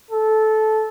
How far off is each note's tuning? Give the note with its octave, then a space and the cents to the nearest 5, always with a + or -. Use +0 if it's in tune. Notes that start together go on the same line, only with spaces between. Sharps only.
A4 -15